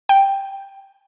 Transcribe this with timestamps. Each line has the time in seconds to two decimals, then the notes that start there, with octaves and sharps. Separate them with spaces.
0.09 G5